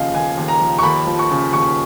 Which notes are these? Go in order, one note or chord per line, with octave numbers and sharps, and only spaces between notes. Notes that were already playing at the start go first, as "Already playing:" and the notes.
Already playing: D#2 C#3 F3 D#5 F5
D#2 G#5
D#2
A#5
F3
C#6
D#2 B5
F3
C#6
C#3
D#2 C#6